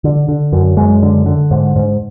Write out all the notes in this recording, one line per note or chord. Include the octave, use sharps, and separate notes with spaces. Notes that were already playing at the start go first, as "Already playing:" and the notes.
D3
D3
F#2
F#2 G#3
D3
D3
G#2
G#2